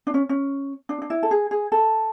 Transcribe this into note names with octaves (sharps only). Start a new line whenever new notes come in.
D4
C#4
C#4
D4
D4
E4
A4
G#4
G#4
A4